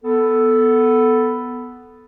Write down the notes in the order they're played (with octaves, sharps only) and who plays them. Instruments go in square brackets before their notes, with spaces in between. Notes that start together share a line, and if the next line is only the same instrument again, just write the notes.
[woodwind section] B3 A4